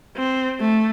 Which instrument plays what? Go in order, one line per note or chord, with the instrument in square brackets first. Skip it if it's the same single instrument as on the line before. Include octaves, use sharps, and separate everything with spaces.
[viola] C4
A3